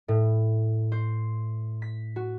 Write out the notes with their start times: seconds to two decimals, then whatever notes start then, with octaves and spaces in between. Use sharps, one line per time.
0.08 A2
0.92 C5
1.82 B6
2.16 F#4